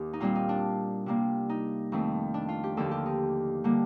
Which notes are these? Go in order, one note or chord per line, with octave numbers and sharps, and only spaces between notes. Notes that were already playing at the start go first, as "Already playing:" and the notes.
Already playing: D#2 G4
D#4
A#2 G3 C4 F4
D#4
D4
C3 G3 A#3
D#4
F2 D#3 A3 C4
D4
F4
G4
D#2 D3 F3 A#3 A4
G4
D#4
D3 G3 A#3